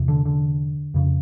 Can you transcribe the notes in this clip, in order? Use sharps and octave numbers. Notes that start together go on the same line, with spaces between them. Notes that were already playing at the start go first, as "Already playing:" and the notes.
Already playing: E2 C3
D3
D3
F2 C#3